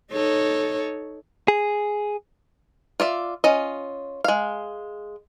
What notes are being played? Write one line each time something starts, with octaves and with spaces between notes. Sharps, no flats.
D#4 A4 C#5
G#4
F4 D5 E5
C#4 F4 D#5
G#3 F5